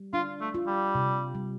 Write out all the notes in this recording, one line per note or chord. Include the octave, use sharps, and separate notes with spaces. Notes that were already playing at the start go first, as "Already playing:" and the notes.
Already playing: G3
D4 F4
A3
F4
G3
C3
G3